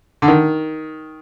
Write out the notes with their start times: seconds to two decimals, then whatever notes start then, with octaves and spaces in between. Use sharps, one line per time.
0.22 D3
0.28 D#3